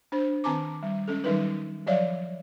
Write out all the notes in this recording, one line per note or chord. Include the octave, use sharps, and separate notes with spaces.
D4 C5
D#3 C4 G#5 A#5 D6
G3
G#3 C#4 A4
D#3 F#3 G3 D#4 A#4 B4
F3 F#3 C#5 D5 E5 F5